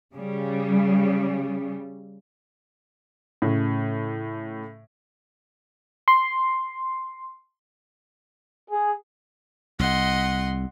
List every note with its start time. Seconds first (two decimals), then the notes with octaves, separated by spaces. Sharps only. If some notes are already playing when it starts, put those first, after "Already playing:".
0.16 C#3 G3
3.42 A2 C#3
6.08 C6
8.69 G#4
9.79 C2 D#5 F#5 C6